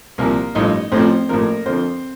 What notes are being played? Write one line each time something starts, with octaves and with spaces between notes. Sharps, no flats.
C2 A#2 F3 A#3 A#4
A1 G2 F3 D#4 D#5
A1 A2 F3 C4 C5
A1 A2 F3 A#3 A#4
F2 D3 F3 C4 C5